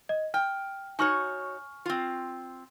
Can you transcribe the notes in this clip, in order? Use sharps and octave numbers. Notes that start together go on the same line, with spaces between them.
D#5
G5 F6
D#4 F#4 C#5 G#5 C#6 F6
C4 F4